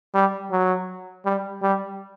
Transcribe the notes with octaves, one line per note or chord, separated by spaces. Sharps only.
G3
F#3
G3
G3